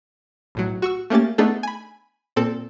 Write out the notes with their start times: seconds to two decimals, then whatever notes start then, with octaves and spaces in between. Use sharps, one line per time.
0.55 B1 A2 F#3
0.82 F#4 C#6 E6
1.10 A3 A#3 C#4 G4 A6
1.38 A3 B3 D4 D#4 G#4 A4
1.63 G#5 B5
2.36 A#2 C4 A4